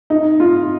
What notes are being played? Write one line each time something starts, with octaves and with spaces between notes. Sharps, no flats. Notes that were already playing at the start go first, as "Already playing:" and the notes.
D#4
F4